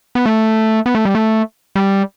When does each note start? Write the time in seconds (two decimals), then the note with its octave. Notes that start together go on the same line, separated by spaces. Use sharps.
0.15 B3
0.26 A3
0.86 B3
0.95 A3
1.05 G3
1.15 A3
1.76 G3